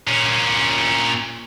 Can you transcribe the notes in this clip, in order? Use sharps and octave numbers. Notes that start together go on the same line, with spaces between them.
A#2 C#4